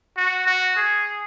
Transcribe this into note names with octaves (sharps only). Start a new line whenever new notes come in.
F#4
F#4
G#4